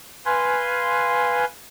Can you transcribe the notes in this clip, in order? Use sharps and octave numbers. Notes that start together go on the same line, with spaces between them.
B4 F5 G#5 C6